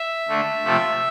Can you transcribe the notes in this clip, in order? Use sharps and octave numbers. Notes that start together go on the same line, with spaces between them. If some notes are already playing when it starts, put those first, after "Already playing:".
Already playing: E5
D3 A3
C3 F3 A3